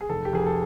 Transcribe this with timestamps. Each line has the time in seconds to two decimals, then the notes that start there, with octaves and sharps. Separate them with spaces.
0.01 G#4
0.09 F1 A4
0.25 G4
0.33 F1 G#4
0.46 A4